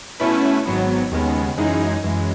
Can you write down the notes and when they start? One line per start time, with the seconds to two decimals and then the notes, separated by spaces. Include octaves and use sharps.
0.20 B2 A3 C#4 E4 B4
0.66 G#1 G#2 F#3 B3
1.11 D#2 C#3 G#3 B3
1.58 F#2 E3 G#3 D#4 G#4
2.04 F#2 E3 G#3